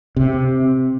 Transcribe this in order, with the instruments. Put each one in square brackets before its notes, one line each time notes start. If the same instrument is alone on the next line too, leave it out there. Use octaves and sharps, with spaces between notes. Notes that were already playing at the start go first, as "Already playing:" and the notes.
[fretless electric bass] C3